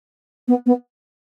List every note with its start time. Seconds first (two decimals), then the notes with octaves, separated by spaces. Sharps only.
0.48 B3
0.66 B3